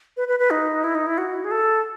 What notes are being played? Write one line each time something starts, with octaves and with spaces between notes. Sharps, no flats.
B4
B4
B4
D#4
E4
D#4
E4
F#4
G#4
A4